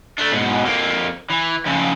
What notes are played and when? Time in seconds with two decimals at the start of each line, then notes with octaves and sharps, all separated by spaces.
0.18 A3 D4
0.32 G#2 B2
0.65 F2 A#3
1.30 E3
1.66 F2 C#3